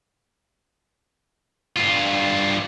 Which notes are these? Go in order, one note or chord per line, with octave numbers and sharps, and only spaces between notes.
G2 F4